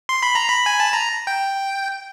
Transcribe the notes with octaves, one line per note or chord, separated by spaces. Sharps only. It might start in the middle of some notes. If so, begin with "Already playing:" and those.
C6
B5
A#5
B5
G#5
A5
A#5
G5